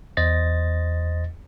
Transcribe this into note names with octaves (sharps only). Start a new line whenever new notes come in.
E2 C5 D#5 A6 A#6